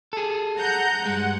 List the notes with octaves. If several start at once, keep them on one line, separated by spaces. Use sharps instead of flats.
G#4 A4
F#5 A#5 G6
G2 G#3 F#5